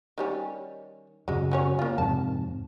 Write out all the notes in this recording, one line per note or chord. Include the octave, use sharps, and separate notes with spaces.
D#3 G3 C#4
F#2 C#3 F#3 G#3
F#3 C#4 C#5
A#3 F4
F2 G#2 C3 A5